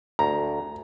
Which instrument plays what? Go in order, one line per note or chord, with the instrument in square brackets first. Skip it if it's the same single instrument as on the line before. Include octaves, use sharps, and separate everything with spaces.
[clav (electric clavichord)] D2 [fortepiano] A#5